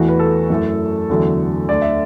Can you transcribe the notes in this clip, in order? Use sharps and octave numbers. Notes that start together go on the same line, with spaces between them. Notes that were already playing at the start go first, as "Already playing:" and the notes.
Already playing: E2 E3 A3 F#4
B4
A4
F#2 E3 A3
E2 D3 F#3 A3
D2 D3 A3 D5
E5